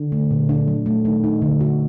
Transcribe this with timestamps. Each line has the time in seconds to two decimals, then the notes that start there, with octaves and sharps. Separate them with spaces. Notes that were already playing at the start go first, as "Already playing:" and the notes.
Already playing: D3
0.12 A3
0.31 A#2
0.49 D4
0.67 F#3
0.86 A3
1.05 D#3 A3
1.24 D#4
1.42 D3
1.61 F#4